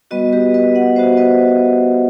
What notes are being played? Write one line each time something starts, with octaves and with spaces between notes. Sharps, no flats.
G3 B3 F#4 B4 D#5
G4 B4
B4 D#5
D#5 F#5
G3 B3 F#4 C5 E5
B4 D#5